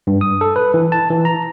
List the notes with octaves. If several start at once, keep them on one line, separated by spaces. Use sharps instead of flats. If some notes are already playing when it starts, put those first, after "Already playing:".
G2
D#6
A4
B4
E3
A5
E3
A#5